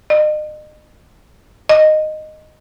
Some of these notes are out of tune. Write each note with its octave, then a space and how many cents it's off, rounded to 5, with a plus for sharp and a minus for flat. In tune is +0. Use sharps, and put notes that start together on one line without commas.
D#5 -40
D#5 -10